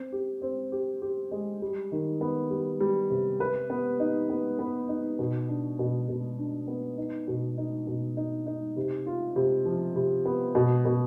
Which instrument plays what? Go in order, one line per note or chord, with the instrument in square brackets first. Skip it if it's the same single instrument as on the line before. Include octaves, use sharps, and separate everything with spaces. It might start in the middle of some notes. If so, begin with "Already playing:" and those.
Already playing: [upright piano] C4
G4
C4
G4
G4
G#3
G3
D#3
B3
G3
G3
C3
B4
B3
D#4
B3
B3
D#4
B2
D4
B2
B2
D4
B3
D#4
B2
D#4
B2
D#4
D#4
C3
F4
C3
F3
C3
B3
B2
B2